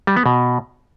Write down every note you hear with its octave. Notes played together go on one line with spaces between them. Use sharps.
G3
B3
B2